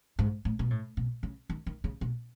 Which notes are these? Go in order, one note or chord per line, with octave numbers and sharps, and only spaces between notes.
G#2
A2
B2
A2
B2
C#3
D#3
D#3
C#3
B2